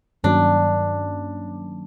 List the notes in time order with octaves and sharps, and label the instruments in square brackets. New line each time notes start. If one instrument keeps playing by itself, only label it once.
[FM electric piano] G2 D#3 F#3 A#3 C#4 [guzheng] D4